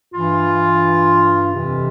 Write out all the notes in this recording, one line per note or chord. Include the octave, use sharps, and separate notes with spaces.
G2 E3 F4
F2 C3 E3